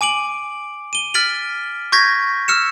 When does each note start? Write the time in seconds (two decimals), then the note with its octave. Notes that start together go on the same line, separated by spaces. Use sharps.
0.01 G#5 D6 D7 F#7
0.93 D#7 G7
1.14 F6 A6 B6 D7 F#7
1.92 C#6 G6 G#6 A#6 B6
2.48 E6 F6 C#7 E7